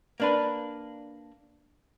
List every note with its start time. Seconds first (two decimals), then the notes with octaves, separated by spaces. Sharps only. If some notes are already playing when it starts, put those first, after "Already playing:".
0.20 A#3 D4 B4